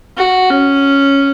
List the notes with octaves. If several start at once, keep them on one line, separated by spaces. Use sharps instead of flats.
F#4
C#4